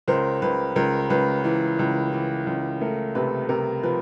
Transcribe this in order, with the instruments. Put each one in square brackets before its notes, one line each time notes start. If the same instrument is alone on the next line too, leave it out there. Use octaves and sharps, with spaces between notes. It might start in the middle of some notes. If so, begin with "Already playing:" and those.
[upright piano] C#2 A#4 C5
C#2 B4
C#2 A#4
C#2 B4
E3
C#2
E3
C#2
A3 A#4
C3 B4
C3 A#4
F3 B4